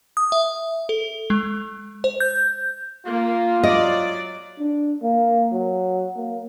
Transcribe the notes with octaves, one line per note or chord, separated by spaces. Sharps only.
D#6
E5
A4
G#3
C5
G6
A#3 F4
F#3 D5 D#5
D4
A#3
F#3
A#3